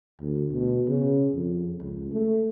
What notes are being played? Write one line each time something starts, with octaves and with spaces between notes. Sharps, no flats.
D2
B2
C#3
F2
C#2
A3